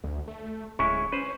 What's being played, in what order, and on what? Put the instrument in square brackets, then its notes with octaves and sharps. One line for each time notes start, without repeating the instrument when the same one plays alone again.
[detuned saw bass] D2
A3
[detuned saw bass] D1 [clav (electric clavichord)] G#3 C#4 E4 [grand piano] C#6
[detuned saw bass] C#4 [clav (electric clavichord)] B4 C5